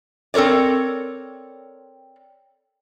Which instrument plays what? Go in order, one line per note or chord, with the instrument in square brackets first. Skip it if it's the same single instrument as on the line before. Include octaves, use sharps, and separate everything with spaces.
[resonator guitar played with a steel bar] C4 A4 A#4 C#5 D5